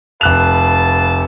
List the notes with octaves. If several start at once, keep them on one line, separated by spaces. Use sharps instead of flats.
F1 B4 F5 A5 F#6 F7